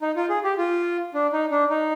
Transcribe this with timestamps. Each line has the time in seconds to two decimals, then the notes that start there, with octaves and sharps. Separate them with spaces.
0.02 D#4
0.16 F4
0.29 G#4
0.44 G4
0.58 F4
1.14 D4
1.33 D#4
1.51 D4
1.70 D#4